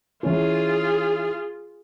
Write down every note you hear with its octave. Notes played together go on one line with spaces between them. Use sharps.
E3 C#4 F4 G#4